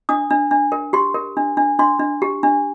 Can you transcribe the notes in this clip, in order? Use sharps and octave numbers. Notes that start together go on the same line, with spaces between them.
D4 D#6
D4
D4
A#4
G4 C6
A#4
D4
D4
D4 C6
D4
G4
D4